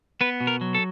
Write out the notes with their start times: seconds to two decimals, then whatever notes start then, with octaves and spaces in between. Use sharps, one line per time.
0.21 B3 B4
0.41 B2
0.47 A#4
0.61 F#3
0.75 A4